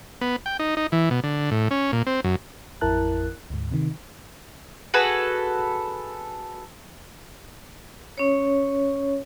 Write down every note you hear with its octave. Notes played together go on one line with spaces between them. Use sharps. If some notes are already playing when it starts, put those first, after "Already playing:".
B3
G5
D#4
D#4
E3
B2
D3
A2
C#4
A#2
C4
F#2
A1 F2 E4 A#4 A5 F#6
D2 G#2
C3 D#3
F#4 G#4 A4 B4
C#4 C#5